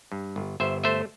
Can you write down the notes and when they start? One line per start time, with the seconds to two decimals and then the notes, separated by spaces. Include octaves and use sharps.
0.12 G2
0.36 G1
0.60 G1 C5 E5
0.84 A3 C5 E5